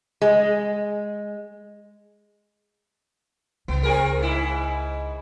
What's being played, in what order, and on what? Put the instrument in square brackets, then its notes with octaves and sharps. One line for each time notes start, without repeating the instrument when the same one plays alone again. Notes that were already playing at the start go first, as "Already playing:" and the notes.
[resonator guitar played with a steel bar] G#3
[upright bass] C#2 [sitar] B3
[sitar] C4 G#4 A#4
G#2 E4